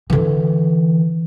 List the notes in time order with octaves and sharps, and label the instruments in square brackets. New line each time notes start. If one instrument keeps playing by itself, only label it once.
[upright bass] D3 E3